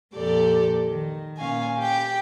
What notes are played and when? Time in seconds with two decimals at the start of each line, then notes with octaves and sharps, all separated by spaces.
0.13 F2 A#2 G4 A4 D5
0.86 D#3
1.37 A#2 C#4 F5 G#5
1.77 G4 G5